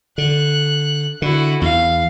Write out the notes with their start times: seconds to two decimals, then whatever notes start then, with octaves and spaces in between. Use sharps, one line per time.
0.18 D3 F#6
1.22 D3 E4 F#4
1.62 E2 F5